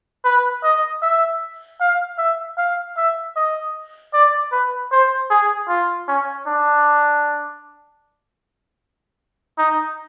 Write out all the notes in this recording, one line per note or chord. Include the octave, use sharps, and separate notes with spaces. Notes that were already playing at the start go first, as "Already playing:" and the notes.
B4
D#5
E5
F5
E5
F5
E5
D#5
D5
B4
C5
G#4
F4
C#4
D4
D#4